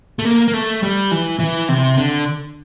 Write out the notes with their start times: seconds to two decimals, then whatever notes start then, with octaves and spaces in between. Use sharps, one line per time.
0.19 A3
0.25 A#3
0.48 A#3
0.54 A3
0.83 G3
1.11 E3
1.39 E3
1.69 C3
1.98 D3